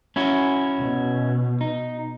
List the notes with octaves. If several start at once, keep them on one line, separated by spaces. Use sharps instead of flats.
C#4 E4 F#4
B2
D#4